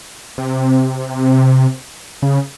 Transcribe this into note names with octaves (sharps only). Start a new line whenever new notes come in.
C3
C#3